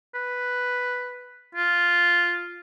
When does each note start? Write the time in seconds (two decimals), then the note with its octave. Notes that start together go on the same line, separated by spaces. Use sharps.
0.15 B4
1.55 F4